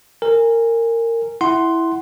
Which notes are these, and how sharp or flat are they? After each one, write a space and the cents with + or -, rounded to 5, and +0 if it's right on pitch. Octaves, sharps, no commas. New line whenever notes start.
A#4 -20 G#5 -20
E4 +0 F#5 +15 C6 +0